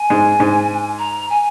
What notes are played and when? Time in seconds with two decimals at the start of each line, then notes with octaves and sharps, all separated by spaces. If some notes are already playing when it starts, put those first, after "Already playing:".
Already playing: G#5
0.10 G#2 G#3
0.40 G#2 G#3
0.99 A#5
1.30 G#5